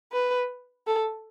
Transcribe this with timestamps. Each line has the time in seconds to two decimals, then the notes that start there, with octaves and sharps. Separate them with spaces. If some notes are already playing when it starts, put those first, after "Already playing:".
0.13 B4
0.87 A4